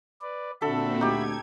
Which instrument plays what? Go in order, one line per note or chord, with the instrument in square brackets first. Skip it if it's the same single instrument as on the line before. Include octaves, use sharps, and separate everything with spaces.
[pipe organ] B4 D5
[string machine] A#2 C4 [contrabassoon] D3 [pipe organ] F#4 E5 B5 [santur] A4
[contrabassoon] D2 [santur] D#4 G4 [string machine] G#6